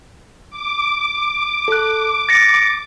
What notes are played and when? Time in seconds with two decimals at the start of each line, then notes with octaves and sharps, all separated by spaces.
0.50 D6
1.68 A4 F#6
2.29 A6 A#6 C#7